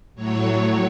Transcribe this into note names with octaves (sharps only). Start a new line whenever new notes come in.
A2 F#3 C#5